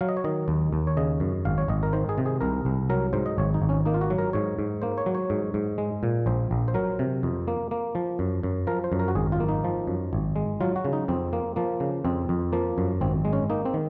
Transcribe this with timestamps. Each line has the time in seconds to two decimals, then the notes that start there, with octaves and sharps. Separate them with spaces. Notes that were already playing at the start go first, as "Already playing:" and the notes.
0.01 F#3 F5
0.09 D#5
0.17 C#5
0.24 D#3 D#5
0.48 D#2
0.73 D#2
0.87 C#5
0.97 C#3 D#5
1.20 F#2
1.45 G#1 F5
1.58 C#5
1.68 G#1 D#5
1.83 A#4
1.93 D#3 C5
2.09 G#4
2.18 C3
2.26 G#4
2.41 C2 A#4
2.65 C2
2.90 F#3 A#4
3.13 G#2 C5
3.26 D#5
3.38 G#1 C#5
3.54 D#4
3.62 G#1
3.69 C#4
3.85 A#3 D#4
3.94 F4
4.01 F#4
4.10 F#3
4.18 A#4
4.33 G#2 C#5
4.59 G#2
4.82 A#3 C5
4.98 C#5
5.06 F#3
5.15 C#5
5.30 G#2
5.54 G#2
5.78 G#3
6.03 A#2
6.26 A#1 C5
6.51 A#1
6.68 C5
6.74 F#3 A#4
6.99 C3
7.23 F2
7.48 A#3
7.71 A#3
7.95 F3
8.19 F#2
8.43 F#2
8.67 F3 A#4
8.84 C5
8.92 F#2
8.99 A#4
9.08 F#4
9.15 G#1 G#4
9.32 F4
9.40 A#3
9.49 D#4
9.64 F3
9.87 F#2
10.13 G#1
10.36 G#3
10.61 F#3 F4
10.76 F#4
10.85 C#3
10.93 D#4
11.08 F2 C4
11.33 A#3
11.56 F3 A#3
11.80 C#3
12.05 F2 C4
12.29 F2
12.52 F3 A#3
12.78 F#2
13.01 G#1 C4
13.25 G#3
13.33 C#4
13.50 A#3 D#4
13.65 C4
13.74 D#3